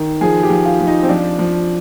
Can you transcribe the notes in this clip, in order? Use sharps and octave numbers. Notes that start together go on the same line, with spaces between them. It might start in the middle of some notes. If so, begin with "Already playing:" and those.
Already playing: D#3
F3 G#4
G4
F3
F4
F3
D#4
C4
F3 D4
F3